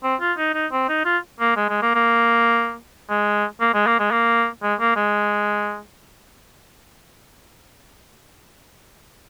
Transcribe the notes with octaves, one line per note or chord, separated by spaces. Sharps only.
C4
F4
D#4
D#4
C4
D#4
F4
A#3
G#3
G#3
A#3
A#3
G#3
A#3
G#3
A#3
G#3
A#3
G#3
A#3
G#3